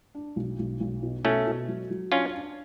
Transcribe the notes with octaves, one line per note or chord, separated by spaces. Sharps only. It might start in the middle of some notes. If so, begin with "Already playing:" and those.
D4
B1
B1
B1
B2
B2 A3 C#4
B2
F#3
F#3
C#4 D4 F4
D4